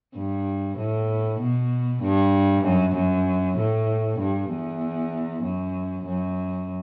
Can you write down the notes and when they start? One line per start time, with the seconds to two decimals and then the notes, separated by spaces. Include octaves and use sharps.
0.16 G2
0.78 A2
1.40 B2
2.03 G2
2.64 F#2
2.96 F#2
3.58 A2
4.19 G2
4.50 E2
5.43 F#2
6.06 F#2